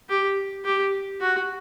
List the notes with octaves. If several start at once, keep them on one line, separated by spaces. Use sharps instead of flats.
G4
G4
F#4